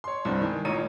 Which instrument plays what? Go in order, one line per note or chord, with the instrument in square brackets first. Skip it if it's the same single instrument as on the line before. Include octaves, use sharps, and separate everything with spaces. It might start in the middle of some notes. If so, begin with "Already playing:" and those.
[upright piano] C#5 C6
C2 G2 C4 D4
D#3 G#3
A1 A#2 A#4 C#5 D#7